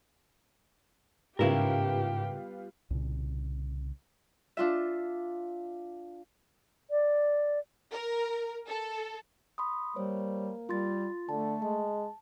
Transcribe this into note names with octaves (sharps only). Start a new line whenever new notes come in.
G#2 C#3 G3 B3 E4 F4 G4 A#4
C2 A#2 C#3
D4 F4 E5
D5
A#4
A4
B5 C6 D#6
G3 A#3 C5 C#5
G3 F4 C6 A6
D3 A3 A5
G#3 A5